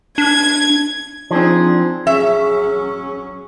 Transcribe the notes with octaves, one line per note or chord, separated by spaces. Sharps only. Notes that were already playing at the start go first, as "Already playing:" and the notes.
D4 G#6
F3 C4 D4 D#4 G#4
F#3 C#4 G#4 E5